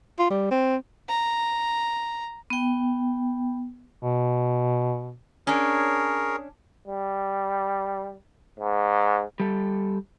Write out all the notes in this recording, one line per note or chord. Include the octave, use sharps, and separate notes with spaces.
F4
G3
C4
A#5
B3 G5
B2
C#4 D4 G#4 A#4 C#5
G3
G#2
G3 A4